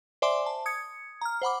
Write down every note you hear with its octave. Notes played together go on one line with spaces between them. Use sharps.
C5 D5 E5 G#5 C6 D6
A5
D#6 G#6 C#7
A#5 F6
C5 F#5 B5 D6